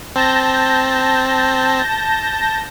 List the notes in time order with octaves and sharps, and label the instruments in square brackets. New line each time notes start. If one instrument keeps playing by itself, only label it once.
[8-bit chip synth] C4 [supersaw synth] A5 G6 A#6